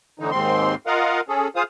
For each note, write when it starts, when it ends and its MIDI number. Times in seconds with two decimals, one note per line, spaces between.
0.19 0.31 45
0.19 0.31 50
0.19 0.31 52
0.19 0.31 63
0.31 0.75 39
0.31 0.75 44
0.31 0.75 60
0.31 0.75 84
0.87 1.21 65
0.87 1.21 70
0.87 1.21 75
0.87 1.21 77
0.87 1.21 78
1.28 1.48 61
1.28 1.48 68
1.28 1.48 69
1.56 1.63 65
1.56 1.63 68
1.56 1.63 72
1.56 1.63 77
1.56 1.63 87